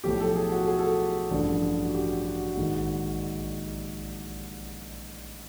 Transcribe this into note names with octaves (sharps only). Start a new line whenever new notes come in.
B1 A2 F3 G4
A4
G#4
F#4
G#4
A4
G#4
A1 G2 D3 F3
F#4
G4
F#4
A#1 G#2 D#3